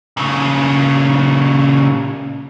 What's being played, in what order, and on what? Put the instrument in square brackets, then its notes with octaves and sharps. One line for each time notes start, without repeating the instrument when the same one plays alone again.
[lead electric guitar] A#2 C#3